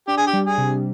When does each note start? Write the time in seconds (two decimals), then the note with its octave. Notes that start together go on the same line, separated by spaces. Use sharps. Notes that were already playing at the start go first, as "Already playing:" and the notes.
0.08 D4 G4
0.18 G#4
0.27 G4
0.33 G3
0.45 G#4
0.58 C3